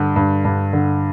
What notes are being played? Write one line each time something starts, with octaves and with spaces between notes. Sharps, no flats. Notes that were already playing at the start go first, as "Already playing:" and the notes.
Already playing: G2 D3
G2
G2
D3